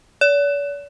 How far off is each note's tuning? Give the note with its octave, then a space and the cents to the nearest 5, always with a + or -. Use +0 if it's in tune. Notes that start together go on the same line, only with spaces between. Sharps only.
D5 -45